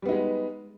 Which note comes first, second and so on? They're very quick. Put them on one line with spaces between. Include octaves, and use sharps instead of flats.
G3 B3 D#4 G#3